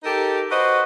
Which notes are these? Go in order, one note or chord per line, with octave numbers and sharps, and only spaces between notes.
D#4 G4 A4 A#4
F#4 B4 C5 D#5